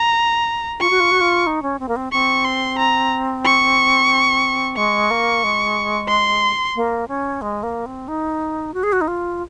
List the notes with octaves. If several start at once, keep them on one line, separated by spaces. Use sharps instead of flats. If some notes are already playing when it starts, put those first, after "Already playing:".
Already playing: A#5
F4 C#6
F#4
F4
F#4
F4
D#4
C#4
C4
A#3
C4
C4 C#6
C6
A#5
C#6
G#3 C#6
A#3
G#3
C6
A#3
C#4
G#3
A#3
C4
D#4
F#4
G#4
F#4
D#4
F4